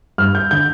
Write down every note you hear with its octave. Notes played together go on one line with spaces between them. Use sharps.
G2 F6
G6
D3 G6